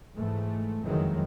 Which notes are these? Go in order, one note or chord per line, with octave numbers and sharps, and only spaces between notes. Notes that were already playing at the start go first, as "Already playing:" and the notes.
G#2 E3 A3
F#1 F2 D#3 E3 F#3 G#3